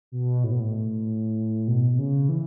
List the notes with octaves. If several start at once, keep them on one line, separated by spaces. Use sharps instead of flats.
B2
A2
B2
A2
B2
B2
C#3
E3